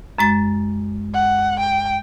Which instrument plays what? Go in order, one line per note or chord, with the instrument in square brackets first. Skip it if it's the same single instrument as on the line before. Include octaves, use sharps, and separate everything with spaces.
[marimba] F#2 G#3 A6
[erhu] F#5
G5